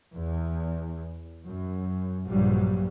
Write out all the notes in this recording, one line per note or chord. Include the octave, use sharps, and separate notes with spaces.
E2
F#2
A#1 G2 F#3 G3